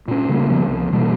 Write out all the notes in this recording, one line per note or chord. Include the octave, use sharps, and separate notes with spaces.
A#2 C#4
C#3 G3 A3 A#3
D#1 C#3 F3 B3
C2
B2 E3 G3 A#3